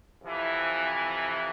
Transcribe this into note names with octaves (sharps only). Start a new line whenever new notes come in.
F2 C3 E3